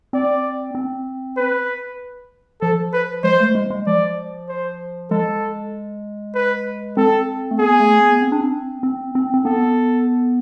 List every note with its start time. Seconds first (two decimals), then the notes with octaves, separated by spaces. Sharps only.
0.13 C4 D5
0.75 C4
1.37 B4
2.61 F3 A4
2.93 B4
3.24 G#3 C5
3.40 A3
3.55 G#3
3.70 G#3
3.87 F3 D5
4.49 C5
5.10 G#3 A4
6.35 B4
6.97 C4 A4
7.51 A3
7.59 B3 G#4
7.80 A3
8.00 B3
8.22 C4
8.32 D4
8.41 C4
8.83 C4
9.15 C4
9.34 C4
9.45 B3 A4